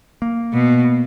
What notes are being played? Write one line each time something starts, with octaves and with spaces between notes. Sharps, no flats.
A#3
B2